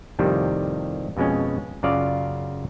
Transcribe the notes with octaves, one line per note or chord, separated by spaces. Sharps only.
F2 A2 C3 D#3 G3
F2 B2 G#3 C#4
F#2 C#3 F4 D5 F5